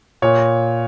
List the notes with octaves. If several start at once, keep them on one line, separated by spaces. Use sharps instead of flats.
A#2 C#5